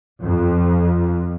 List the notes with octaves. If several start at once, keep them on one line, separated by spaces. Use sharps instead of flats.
F2